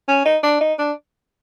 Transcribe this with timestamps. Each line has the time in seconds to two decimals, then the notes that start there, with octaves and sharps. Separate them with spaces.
0.08 C#4
0.25 D#4
0.43 D4
0.61 D#4
0.79 D4